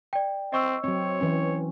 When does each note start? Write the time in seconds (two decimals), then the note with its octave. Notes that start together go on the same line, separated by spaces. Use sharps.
0.13 D5 G5
0.53 C4 D#5 C#6 E6
0.84 F#3 C4 C#5
1.21 E3 C#4